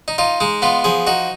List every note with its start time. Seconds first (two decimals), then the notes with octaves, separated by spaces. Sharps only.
0.08 D#4
0.18 D#4 F4
0.40 G#3 D#4
0.62 B3 F4
0.84 F3 G#4
1.07 D#4 F#4